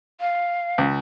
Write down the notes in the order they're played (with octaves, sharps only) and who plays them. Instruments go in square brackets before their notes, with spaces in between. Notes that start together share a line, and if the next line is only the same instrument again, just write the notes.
[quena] F5
[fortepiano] C#2